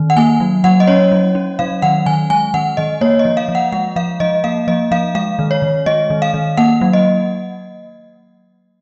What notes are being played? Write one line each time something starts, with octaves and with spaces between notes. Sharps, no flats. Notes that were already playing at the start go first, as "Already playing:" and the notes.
Already playing: D#3
F#5
A#3 G#5
F#3
F#3 F#5
D#5
C#4 C#5
F#3
C#4
F#3 F5
D#3 F#5
D#3 G#5
G#3 G#5
D#3 F#5
D#3 D#5
A#3 C#5
D#5
F3
F5
F3
F#5
G#3 F#5
F3 F5
F3 D#5
A#3 F5
F3 D#5
F3 F5
G#3 F5
D#3
C#5
D#3
G#3 D#5
D#3
F5
D#3
A#3 F#5
F#3
D#5